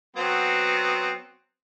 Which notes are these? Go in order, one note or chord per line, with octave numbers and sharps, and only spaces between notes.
F#3 B3 C4